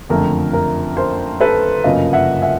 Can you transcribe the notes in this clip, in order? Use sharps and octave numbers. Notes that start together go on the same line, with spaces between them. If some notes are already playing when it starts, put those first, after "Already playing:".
F#1 F2 D3 F3 A3 A#4
A#4
A#4 C5
A4 B4
G1 F#2 C#3 F3 A#3 D#5 F5
E5 F#5
E5 F#5